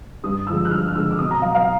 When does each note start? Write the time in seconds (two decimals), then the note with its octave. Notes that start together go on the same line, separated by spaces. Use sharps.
0.23 G2 D#6
0.47 D3 F3 G#3 E6
0.65 F#6
0.71 G2 F6
0.88 F6
0.95 D3 F3 G#3 E6
1.11 D6
1.18 B2 D#6
1.31 A#5
1.42 F#3 F5
1.55 F5